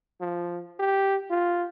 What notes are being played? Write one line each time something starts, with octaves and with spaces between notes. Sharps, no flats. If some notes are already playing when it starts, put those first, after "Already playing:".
F3
G4
F4